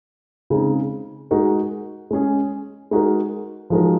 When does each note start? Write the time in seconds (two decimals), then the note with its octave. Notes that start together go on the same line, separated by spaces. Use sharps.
0.50 C#3 G#3 C4 D#4
1.31 G#3 D#4 F#4 A#4
2.11 G#3 C#4 G#4
2.91 G#3 D#4 F#4 A#4
3.70 F3 G#3 D#4 F#4 A#4